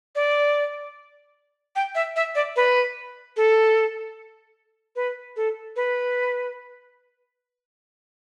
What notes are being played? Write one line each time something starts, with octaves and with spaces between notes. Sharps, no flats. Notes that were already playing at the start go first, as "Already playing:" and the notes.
D5
G5
E5
E5
D5
B4
A4
B4
A4
B4